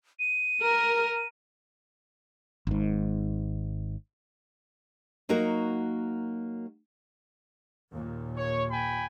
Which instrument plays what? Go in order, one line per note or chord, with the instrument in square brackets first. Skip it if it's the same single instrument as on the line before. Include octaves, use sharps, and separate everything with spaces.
[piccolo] D#7
[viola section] A#4
[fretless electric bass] G#1 G#2
[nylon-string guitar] F#3 A#3 D#4 F#4 A#4
[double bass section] D#2 A#2
[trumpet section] C#5
G5 G#5 B5